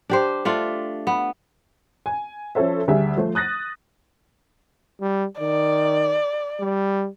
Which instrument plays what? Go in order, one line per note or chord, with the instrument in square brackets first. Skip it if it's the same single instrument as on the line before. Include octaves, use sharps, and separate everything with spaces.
[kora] D4 G4 C5
A3 D4 F4
B3
[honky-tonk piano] G#5
F3 C#4 A4 C5 E5
D2 G3 G#4 E5
F3 A3 C5
D#6 F#6 A6 A#6
[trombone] G3
[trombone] D#3 [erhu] D5
[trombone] G3